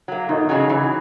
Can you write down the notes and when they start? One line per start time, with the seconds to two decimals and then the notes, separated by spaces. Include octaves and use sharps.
0.08 F#3 A#3
0.29 E2 D#4
0.49 C#3 F#3 C#4
0.69 E3